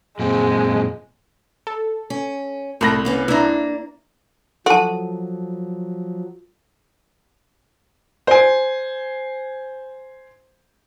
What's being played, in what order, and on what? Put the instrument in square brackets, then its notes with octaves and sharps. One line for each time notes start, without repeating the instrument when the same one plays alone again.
[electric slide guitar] F#2 A#2 C4 [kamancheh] G#3
[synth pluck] A4
[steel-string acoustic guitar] C#4
[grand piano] C2 B5 A#6 [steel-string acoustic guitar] A2 A3
[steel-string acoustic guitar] A#3 B3 C#4
[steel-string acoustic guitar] A#3 D4 [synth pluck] E4 A#5
[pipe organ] F3 F#3 [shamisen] F#4 [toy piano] A4 A5
[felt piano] C5 G#5